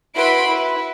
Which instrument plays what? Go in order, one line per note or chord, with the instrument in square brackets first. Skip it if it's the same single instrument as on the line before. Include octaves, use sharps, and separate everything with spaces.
[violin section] E4 F#4 B4 B5 C6 D7
E4 B4